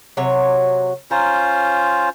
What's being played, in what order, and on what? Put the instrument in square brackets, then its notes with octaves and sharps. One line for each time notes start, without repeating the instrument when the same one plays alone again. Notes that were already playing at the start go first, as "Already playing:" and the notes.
[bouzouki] C3 F#3 C#5
[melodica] C#4 F4 C5 [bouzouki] A#5